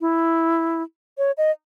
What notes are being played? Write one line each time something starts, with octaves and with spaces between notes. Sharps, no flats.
E4
C#5
D#5